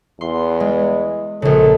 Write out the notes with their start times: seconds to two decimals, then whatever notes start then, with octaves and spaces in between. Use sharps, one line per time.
0.21 E2 C6
0.60 G#3
1.42 A#1 C#3 A4